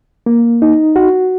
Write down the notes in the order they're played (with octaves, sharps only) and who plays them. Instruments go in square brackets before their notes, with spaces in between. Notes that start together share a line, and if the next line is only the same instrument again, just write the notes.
[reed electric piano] A#3
D#4
F#4